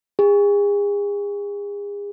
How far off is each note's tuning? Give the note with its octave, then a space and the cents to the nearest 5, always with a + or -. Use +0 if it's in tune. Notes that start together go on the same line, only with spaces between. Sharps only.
G#4 -35